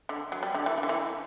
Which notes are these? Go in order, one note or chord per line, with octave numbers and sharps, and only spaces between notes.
D3
F#3
G3
D3
E3
E3
D3
E3